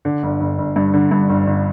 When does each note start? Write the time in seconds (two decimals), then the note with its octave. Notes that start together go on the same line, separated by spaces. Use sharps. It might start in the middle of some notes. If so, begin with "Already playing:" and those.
0.05 D3
0.23 G1
0.40 G1
0.58 G1
0.76 G2
0.94 D3
1.11 G2
1.29 G1
1.47 G1